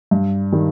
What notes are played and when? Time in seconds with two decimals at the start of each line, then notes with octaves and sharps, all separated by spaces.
0.11 G2
0.52 D#3 G3